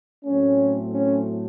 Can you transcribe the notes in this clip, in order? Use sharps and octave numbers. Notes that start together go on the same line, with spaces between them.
A2 F#3 A3 C4 C#4
C#4